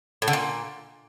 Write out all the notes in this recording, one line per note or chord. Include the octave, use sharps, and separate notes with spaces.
A2
D3
A#2